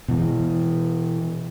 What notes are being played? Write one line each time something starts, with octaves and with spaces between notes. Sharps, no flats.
B2 E3